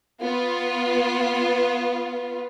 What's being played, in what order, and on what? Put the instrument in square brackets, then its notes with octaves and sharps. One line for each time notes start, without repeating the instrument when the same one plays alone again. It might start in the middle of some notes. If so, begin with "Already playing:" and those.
[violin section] B3 F4